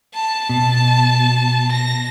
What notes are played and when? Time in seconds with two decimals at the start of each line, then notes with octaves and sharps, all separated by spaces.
0.15 A5
0.49 B2
1.71 A#6